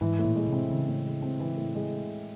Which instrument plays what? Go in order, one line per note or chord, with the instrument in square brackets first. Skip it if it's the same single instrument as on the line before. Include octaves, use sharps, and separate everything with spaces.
[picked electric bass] G#2 [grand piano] E3
[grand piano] A2
[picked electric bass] A#2
[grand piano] G#3
[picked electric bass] C3
[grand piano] C4
[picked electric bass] C#3 [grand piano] E3
[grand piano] A2
G#3
C4
E3
A2
G#3